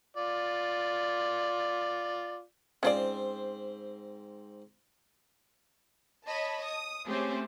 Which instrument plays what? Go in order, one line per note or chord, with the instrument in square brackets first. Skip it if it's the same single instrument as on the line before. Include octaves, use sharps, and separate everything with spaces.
[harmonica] F4 D5
[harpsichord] G#2 C4 C5 [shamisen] C#4 F4 D5
[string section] C#5 D#5 A5 B5
D#6
A3 C4 C#4 G4 G#4 C5